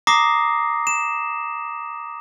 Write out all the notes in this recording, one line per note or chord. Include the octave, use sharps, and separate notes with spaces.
A#5 D6 D#6 A#6 C7
E7